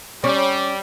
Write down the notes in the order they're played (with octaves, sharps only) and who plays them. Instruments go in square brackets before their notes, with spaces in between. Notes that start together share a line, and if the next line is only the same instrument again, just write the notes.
[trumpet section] G3 [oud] C#4 [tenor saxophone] D5